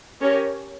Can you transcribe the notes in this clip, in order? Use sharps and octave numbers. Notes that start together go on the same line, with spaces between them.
C#4 G4 A#4 C#5